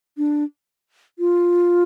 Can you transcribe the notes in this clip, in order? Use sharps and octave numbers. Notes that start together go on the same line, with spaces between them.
D4
F4